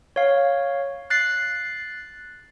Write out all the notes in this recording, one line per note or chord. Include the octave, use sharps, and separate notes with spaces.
C#5 F5
F#6 A6 C7